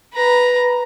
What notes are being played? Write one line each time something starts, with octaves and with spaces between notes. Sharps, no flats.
B4 A#5